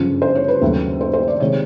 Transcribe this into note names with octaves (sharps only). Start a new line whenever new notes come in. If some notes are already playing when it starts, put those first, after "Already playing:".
Already playing: G1 F#2 C#3 F3
C5
C#5
B4
D#2 C#3 F#3 A3
C5
C5
D5
C3 D#3 G#3 C#5